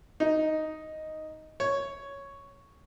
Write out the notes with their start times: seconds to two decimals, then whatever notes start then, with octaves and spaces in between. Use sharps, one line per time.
0.20 D#4
1.60 C#5